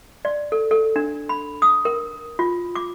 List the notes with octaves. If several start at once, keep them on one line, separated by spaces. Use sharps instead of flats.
D5
A4
A4
D4
B5
D#6
A#4
F4
D6